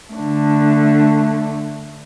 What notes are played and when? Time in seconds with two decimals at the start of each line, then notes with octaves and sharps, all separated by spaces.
0.11 D3 A3